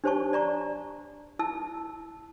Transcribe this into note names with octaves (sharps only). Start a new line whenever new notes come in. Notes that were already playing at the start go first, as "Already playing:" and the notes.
D4 G4 C5 C#5 A5 C#6
D5 A#5 C#6
E4 A5 E6